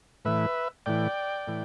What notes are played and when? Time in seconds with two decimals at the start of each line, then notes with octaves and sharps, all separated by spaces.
0.25 A2 E3 B4 E5
0.86 A2 E3 D5 G5
1.47 A2 E3